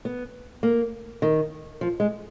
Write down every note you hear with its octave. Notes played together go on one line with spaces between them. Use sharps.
B3
A#3
D#3
F3
G#3